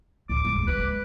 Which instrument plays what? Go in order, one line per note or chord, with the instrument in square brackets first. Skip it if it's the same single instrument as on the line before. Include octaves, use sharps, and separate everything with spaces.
[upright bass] D2 A2 [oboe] D6
[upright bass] E2 G#3
[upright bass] G#3 [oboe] B4